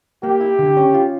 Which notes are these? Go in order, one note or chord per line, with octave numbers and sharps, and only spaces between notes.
A#3 G4
E4
D3
C#4
F4